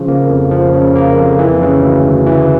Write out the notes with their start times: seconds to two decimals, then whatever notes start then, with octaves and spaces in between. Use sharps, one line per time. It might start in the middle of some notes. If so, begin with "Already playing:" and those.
Already playing: C#3 F3
0.08 A#3
0.30 F2
0.51 F3
0.73 C#3
0.95 A#3
1.17 F2
1.39 E3
1.61 C#3
1.82 D2
2.04 D2
2.26 E3